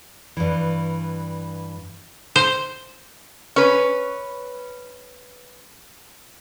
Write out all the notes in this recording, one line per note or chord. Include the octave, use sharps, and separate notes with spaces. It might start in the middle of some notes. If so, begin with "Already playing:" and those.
G2 E3
C5
C#4 B4